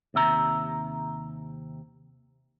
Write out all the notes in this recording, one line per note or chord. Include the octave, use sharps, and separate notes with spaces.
D#2 C3 E5 A#5